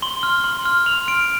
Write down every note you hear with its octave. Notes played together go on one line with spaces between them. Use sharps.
C6 G7
F6
C6
F6
C6 F7
F6 D7